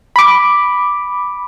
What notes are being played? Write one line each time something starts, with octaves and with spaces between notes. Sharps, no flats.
B5 D6